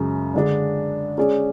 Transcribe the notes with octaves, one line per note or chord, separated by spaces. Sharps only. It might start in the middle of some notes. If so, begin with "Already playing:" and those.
Already playing: F#2 C#3 G#3
D3 G#3 D4
G#3 C#4 G#4 D5